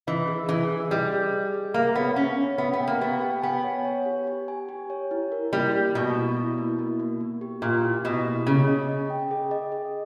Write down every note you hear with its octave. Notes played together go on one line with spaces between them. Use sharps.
E3 D#5
G#4
E3 G#4
G#4
G3 D#5
G#4
G#4
G#4
A#3 E5
B3 C#5
C#4 C#5
C#5
B3 E5
B3
G5
A#3
B3 G4
G5
B3 G#5
C#5
C#5
G4
G4
G#5
G4
C#5
E4
A#4
G3 A#3
A#3
B2 A#3
E4
E4
A#3
A#3
A#3
A#3
G4
A#2 G4
E4
B2 G4
A#3
C#3 G#4
D#5
D#5
G5
G#4
D#5
G#4